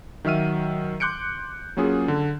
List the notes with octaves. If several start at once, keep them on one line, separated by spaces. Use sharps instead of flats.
D#3 F#3 E5 F6 D#7
C6 D6 F#6 G6 C#7 D7
F#3 A#3 C#4 F4 G#4
D3